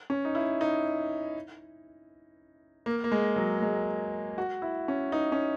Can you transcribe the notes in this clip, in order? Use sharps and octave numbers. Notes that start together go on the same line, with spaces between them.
C#4
D#4
E4
D#4
A#3
A#3
G#3
F#3
G#3
F#4
E4
C#4
D#4
C#4